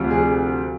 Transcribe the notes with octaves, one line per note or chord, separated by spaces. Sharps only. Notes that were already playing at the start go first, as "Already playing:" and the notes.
Already playing: D2 C3 F3
G#4